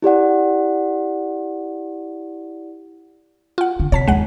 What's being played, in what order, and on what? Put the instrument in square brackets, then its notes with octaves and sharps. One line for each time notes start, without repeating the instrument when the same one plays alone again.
[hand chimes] E4 G4 D5 F#5
[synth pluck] F4 F#5
[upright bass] D3
[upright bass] C3 [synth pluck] C#5 A5 B6
[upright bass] D#2 D#3 [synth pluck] G#3 F#5